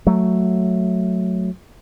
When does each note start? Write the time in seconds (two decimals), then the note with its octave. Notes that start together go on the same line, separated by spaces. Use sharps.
0.07 F#3 A3